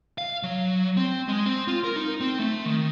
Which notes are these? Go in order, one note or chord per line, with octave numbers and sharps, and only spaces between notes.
F5
F#3
C4
G#3
C4
F4
A#4
D#4
C4
A3
D#3